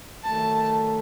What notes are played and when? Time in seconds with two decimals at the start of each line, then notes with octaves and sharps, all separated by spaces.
0.23 D#3 F#3 A3 A5